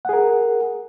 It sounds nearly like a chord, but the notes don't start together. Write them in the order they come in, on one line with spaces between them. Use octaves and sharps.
F#5 G#4 A#4